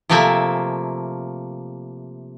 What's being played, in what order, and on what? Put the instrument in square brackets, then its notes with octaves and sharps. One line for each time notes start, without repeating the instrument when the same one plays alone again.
[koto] C3 F3 A3 A#3 E5 G#5